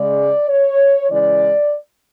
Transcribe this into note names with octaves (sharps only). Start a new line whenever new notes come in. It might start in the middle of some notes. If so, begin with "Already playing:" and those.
Already playing: C#3 G#3 D5
C#5
C#3 E3 G#3 D5